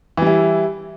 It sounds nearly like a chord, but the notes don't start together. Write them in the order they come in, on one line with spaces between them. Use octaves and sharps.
E3 G3 E4